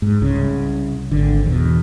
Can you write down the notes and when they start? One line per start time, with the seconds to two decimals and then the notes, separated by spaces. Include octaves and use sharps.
0.02 G#2
0.22 C2 C#3
1.12 G#1 D3
1.46 E2 B2